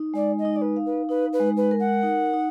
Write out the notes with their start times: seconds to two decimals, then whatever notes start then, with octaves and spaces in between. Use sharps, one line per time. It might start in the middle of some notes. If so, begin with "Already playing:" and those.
Already playing: D#4
0.14 G#3 D5
0.38 D#5
0.45 D#4
0.55 D5
0.61 B4
0.76 F5
0.85 B4
1.09 D#4 B4
1.32 B4
1.40 G#3
1.56 B4
1.71 A#4
1.79 F#5
2.03 D#4
2.34 D#4